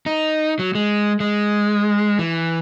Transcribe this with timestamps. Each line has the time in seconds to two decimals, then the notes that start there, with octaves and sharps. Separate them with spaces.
0.06 D#4
0.59 F#3
0.75 G#3
1.20 G#3
2.19 E3